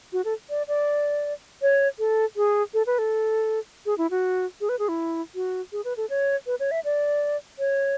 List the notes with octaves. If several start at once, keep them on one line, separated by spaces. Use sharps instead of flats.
F#4
A4
D5
D5
C#5
A4
G#4
A4
B4
A4
G#4
E4
F#4
G#4
B4
G#4
E4
F#4
G#4
B4
A4
C#5
B4
C#5
E5
D5
C#5